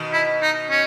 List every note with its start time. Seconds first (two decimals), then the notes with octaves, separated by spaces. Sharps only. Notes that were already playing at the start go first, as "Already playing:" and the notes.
Already playing: B2 D#3
0.13 E4
0.42 D#4
0.71 C#4